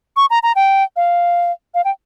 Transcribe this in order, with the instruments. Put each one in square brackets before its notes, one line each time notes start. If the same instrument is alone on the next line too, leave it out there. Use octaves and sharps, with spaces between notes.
[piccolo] C#6
A#5
A#5
G5
F5
F5
G5